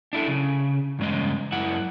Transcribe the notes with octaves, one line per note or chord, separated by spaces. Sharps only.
D4 E4 A4
C#3
E2 G2 C#3 G#3 D#5
F#2 E4 F#5